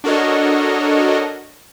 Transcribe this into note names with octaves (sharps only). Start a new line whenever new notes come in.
D4 F#4 A4 A#4 C#5 D#5